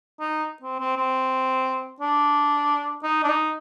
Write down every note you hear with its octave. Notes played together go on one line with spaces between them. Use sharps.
D#4
C4
C4
C4
D4
D#4
D4
D#4